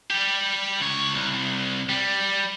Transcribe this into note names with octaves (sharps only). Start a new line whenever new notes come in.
G3 G4
C#2 C#5
C2
G3